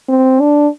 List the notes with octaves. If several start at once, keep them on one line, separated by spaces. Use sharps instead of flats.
C4
D4